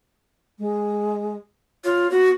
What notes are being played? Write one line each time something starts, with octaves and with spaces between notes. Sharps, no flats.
G#3
F4 C#5
B3 F#4